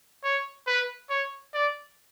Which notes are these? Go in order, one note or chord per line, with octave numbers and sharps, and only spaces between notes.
C#5
B4
C#5
D5